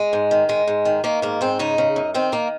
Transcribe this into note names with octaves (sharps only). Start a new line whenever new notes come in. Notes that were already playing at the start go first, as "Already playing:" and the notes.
Already playing: G#3
G#2
D#3
G#2 G#3
G#2
D#3
D#3 A#3
G#2 A#3
G#2 C4
C#3 D#4
C#3
F#2
D#3 C4
D#3 A#3